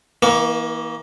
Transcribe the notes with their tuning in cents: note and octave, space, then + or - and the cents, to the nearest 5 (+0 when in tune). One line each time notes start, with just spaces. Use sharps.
E3 -25 A#3 +25 C#6 +30